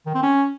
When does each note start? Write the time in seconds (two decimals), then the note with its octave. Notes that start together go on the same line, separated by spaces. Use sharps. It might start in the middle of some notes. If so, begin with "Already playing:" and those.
0.06 D#3
0.15 C4
0.23 C#4